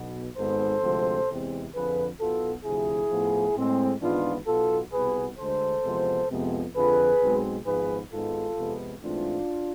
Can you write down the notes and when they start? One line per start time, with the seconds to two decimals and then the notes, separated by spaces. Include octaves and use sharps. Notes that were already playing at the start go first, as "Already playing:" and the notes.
Already playing: B1 B2 B3
0.37 G#1 G#2 G#3 B3 A4 C5
0.82 D2 C3 F3 G#3 C4
1.28 E2 C3 G#3 C4
1.74 F2 D3 F3 G#4 B4
2.19 B1 B2 B3 F4 A4
2.64 D2 C3 F3 E4 G#4
3.10 A2 F3 B3
3.56 A2 G#3 C4
4.01 G#1 G#2 E3 B3 D4 F4
4.46 B1 B2 B3 F4 A4
4.92 C2 B2 B3 G#4 B4
5.38 D2 D3 G#3 A4 C5
5.84 E2 C3 F3 G#3 B3
6.29 F2 C3 G#3 B3
6.74 F2 D3 F3 G#4 B4
7.20 B1 B2 G#3 C4
7.66 G#1 G#2 F3 B3 G#4 B4
8.11 G#1 G#2 G#3 B3 F4 A4
8.57 F2 C3 G#3 B3
9.02 G#2 E3 A3 C4 D4 F4